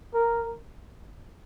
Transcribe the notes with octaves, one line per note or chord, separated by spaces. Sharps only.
A#4